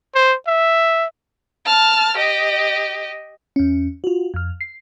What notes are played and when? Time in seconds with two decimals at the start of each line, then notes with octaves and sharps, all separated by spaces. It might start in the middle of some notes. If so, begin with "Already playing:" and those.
0.15 C5
0.47 E5
1.66 A5 F6
2.17 G4 D#5
3.56 E2 C#4
4.04 F4 F#4
4.34 F2 F6
4.61 C7